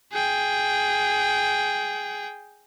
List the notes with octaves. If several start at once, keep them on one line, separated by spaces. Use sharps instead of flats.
G#4 G5